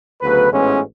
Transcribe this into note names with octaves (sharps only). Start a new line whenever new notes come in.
D2 C#3 F#3 B3 B4
A1 G#2 E3 G#3 B3 C#4